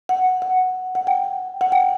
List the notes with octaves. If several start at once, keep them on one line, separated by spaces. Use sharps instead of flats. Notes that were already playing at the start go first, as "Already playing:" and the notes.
F#5
F#5
F#5
G5
F#5
G5